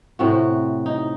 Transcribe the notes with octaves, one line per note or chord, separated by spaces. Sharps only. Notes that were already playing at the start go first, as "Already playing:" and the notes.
A2 C3 F#4
D#4